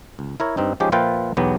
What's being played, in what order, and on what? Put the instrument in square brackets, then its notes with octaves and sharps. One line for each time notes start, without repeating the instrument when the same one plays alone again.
[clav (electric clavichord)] C#2
E4 A#4 C#5
G2 C4 D#4
F3 G#3 C#4 D#4 G4
A#2 F3 F4 B4 E5 G5
B1 E2 F#3 B3 G4